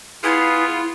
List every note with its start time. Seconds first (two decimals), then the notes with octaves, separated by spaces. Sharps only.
0.24 B3 E4 F4 G#4 B4